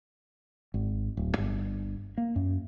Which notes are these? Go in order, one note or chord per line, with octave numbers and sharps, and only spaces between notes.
G#1
D1
G1
A#3
F#2